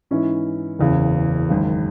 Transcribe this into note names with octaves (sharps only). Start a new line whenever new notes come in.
G#2 E3 C#4 E4
F#1 E2 C#3
G#1 F#2 C#3